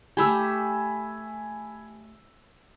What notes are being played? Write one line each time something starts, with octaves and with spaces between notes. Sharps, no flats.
A3 G4 G#5 B5 E6